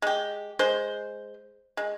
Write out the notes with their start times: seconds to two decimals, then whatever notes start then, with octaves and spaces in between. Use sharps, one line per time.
0.02 G#3 G4
0.59 G#3 C5
1.77 G#3